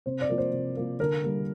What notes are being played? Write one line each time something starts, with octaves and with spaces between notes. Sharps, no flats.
C3 C5
D5
F3 A#3
C5
C3
F3 A#3
D3 A#4
G3 A#3